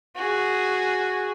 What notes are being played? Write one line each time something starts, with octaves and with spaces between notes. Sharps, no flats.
F#4 G#4